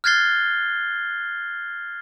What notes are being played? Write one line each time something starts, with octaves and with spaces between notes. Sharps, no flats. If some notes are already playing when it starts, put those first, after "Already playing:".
F6 F#6 G#6 A6 C7 G7